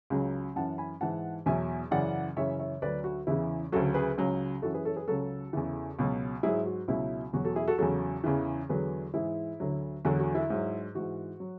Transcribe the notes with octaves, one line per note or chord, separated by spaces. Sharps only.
C#2 C#3 F#3
F#2 E3 F#5 A5
G#5 B5
G#2 E3 F#5 A5
E2 B2 F#3 E5 G#5
F#2 C#3 E3 D5 F#5
F#2 C#3 E3 C#5 E5
C#5 E5
D2 D3 F#3 B4 D5
F#4
E2 C#3 E3 E4
D2 C#3 F#3 F#4 A4
G#4 B4
C#2 C#3 F#3
F#2 E3 F#4 A4
G#4 B4
A4 C#5
G#4 B4
C#2 C#3 F#3 F#4 A4
E2 C#3 E3
C#2 B2 F#3
G#2 F#3 E4 G#4
F#4
C#2 B2 F#3 E4
E2 B2 F#3 F#4
F#4 A4
E4 G#4
F#4 A4
E2 C#3 F#3 F#4 A4
E2 C#3 E3
E2 D3 F#3 G#4 B4
G#2 E3 E4 G#4
D2 D3 F#3
E2 D3 F#3 F#4
F#4
E4
G#2 F#3
G#2 E3 F#4
F#3